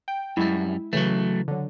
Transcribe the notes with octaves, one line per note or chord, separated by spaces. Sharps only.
G5
F#2 G3 G#3 E4
C#3 E3 F#3 A3
D3 F#3